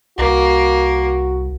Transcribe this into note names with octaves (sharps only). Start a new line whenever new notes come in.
C2 A#3 F#4